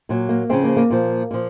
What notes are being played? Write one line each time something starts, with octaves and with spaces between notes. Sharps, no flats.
A#2 F#3
A#3
C#3 F3 C4
A#3
A#3
A#2 F3
A#2 F3